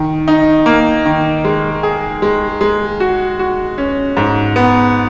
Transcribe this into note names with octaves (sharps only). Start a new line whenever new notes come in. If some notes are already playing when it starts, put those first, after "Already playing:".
Already playing: D#3
D#4
A#3
D#3
G#3
G#4
G#3
G#3
F#4
F#4
C#4
G#2
B3